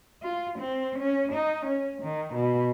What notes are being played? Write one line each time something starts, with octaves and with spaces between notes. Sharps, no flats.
F4
C4
C#4
D#4
C#4
D#3
B2